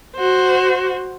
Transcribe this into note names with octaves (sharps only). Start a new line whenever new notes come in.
F#4 C5